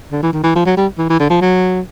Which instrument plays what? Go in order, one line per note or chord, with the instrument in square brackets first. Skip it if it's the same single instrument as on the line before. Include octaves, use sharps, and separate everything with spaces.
[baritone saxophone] D3
E3
D#3
E3
F3
F#3
G3
E3
E3
D3
F3
F#3